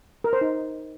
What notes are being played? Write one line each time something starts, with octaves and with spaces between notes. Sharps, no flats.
A#4
C5
D#4